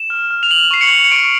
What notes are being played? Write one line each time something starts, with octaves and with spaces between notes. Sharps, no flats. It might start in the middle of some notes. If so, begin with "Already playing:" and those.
Already playing: E7
F6
F6
F7
F6 F#7
C#6 C7
C#7
C#6
C#7
C#6 D7